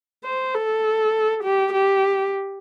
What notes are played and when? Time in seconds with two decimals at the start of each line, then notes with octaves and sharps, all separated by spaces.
0.24 C5
0.54 A4
1.44 G4
1.73 G4